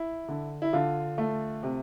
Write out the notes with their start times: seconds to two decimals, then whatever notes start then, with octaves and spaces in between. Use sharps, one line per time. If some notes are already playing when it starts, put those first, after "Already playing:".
Already playing: E4
0.28 D3
0.62 E4
0.73 D3 F4
1.18 A3
1.63 C3